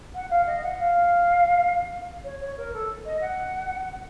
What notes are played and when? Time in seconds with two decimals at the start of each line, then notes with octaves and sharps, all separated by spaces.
0.14 F#5
0.30 F5
0.47 D#5
0.63 F#5
0.79 F5
2.24 C#5
2.41 C#5
2.57 A#4
2.73 A4
3.06 D#5
3.21 F#5